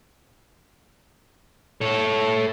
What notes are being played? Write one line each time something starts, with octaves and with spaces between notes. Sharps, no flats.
A4 C#5